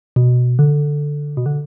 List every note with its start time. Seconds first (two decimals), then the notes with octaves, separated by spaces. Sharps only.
0.16 B2
0.59 D3
1.37 B2
1.46 D3